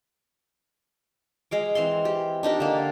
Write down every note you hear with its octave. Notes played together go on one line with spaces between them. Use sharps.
G#3 F5 D6
E3 C4 F5 C6
G4
D4 D#4 G4 A#4
D3 A#3